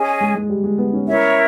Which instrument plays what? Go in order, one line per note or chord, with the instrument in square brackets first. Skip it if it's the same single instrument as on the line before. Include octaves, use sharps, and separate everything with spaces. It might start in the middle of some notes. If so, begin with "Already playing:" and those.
Already playing: [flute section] C#4 G#4 D#5 G#5
[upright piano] G#3
G#3
G3
G#3
B3
C#4
[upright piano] C#4 [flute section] E4 A#4 C#5 E5